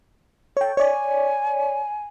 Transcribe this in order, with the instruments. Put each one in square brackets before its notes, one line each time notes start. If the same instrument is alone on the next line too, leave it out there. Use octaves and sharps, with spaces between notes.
[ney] A4 [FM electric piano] C#5 G5
[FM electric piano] C#5 D5 [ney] G#5